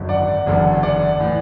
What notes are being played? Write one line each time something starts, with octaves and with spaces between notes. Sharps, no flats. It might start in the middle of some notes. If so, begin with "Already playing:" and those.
Already playing: G#1 F#2 D3
D5 F#5
F#1 E2 D3
D5 F#5
A2 E3